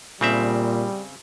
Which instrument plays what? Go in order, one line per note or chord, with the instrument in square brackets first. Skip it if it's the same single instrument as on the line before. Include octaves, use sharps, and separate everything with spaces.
[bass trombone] A#2 [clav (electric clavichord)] C#3 C4 E5 [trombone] G3